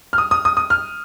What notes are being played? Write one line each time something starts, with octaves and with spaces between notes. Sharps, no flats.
F6
D#6
D#6
D#6
D#6
F6